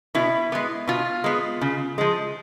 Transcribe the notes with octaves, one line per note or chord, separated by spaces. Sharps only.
B2 E4
G#3 B3
B2 F4
G#3 B3
C#3
F3 G#3